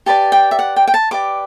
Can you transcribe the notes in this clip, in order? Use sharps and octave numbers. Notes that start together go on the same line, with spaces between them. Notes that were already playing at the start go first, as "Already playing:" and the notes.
G4 B4 D5 A5
G5
E5
F#5
G5
G5
A5
G4 B4 D5 D6